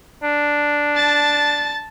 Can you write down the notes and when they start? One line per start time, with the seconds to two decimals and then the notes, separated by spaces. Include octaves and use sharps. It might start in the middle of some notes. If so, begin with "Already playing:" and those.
0.23 D4
0.95 A5 A6